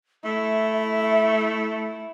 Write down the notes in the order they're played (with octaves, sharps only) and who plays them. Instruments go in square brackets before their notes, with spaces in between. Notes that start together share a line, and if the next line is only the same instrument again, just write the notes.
[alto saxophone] A3 [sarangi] E4 [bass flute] E5